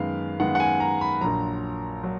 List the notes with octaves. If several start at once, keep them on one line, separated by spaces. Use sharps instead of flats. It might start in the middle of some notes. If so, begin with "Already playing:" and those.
Already playing: F#2 D#3 G#3 B3 F5
F#2 D#3 G#3 B3 F#5
F#5
G#5
A#5
B5
A#1 A#2 F#3 A#5
F#3